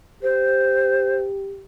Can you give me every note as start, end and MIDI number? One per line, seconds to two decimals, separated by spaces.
0.23 1.65 67
0.23 1.17 72